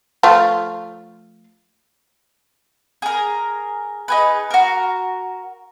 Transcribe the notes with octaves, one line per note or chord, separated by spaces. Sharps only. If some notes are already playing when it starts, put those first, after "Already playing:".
F3 A3 F4
G#4 A#4
D#4 G#4 B4
F#4 A#4